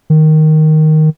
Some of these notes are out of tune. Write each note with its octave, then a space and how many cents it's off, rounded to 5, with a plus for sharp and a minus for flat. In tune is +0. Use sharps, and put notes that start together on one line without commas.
D#3 +0